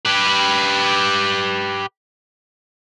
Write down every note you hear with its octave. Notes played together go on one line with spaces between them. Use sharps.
G4 B4